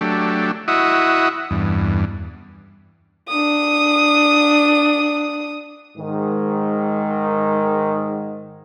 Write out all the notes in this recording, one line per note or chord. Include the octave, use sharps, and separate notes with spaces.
F#3 A3 D4 G4
E4 F#4 D#5 E5 F#5 D#6
E2 G2
D4 D#6
G#2 D#3